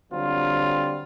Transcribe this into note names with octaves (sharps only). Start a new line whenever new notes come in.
D3 F#3 G3 C4 F4